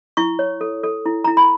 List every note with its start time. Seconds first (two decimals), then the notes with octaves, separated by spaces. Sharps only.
0.17 E4 C#6
0.39 C#5
0.61 A4
0.83 A4
1.05 E4
1.24 E4 A#5
1.37 B5